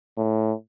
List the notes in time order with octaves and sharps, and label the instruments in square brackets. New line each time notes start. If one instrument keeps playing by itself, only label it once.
[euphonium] A2